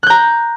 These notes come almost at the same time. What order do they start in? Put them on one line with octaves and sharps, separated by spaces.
F#6 G6 A#5